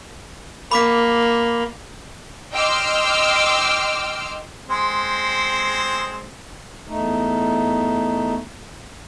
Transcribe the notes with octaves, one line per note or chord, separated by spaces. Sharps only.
A#3 B5 D6 B6
D#5 G5 C6 D6 E6 F6
G#3 C4
E2 A3 D#4